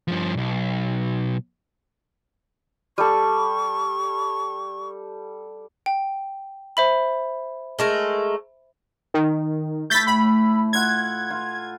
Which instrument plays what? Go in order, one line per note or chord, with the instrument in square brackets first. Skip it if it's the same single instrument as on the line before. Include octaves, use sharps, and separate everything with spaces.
[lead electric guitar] G2 F3
B1
[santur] G3 A4 [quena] C#6
[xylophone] G5
C5 E5 B5
[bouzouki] G#3 A3 A#4
[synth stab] D#3
[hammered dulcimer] A3 E4 [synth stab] G6 A6 B6
[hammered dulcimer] A2 [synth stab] B5
[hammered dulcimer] F4 F#5 [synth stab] G#6
[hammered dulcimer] F4